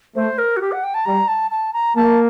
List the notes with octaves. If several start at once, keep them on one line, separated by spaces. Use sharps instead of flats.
A3 C5
A#4
F#4
G4
F#5
G5
A5
G3 A#5
A5
A5
A#5
A#3 A5